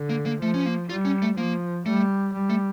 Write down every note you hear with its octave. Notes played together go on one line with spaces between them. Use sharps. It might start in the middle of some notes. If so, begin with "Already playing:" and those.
Already playing: D3
A#3
A#3
F3 A3
C#4
A#3
G3 F4
C#4
A3
F3 A#3
G3 A3
G3
A3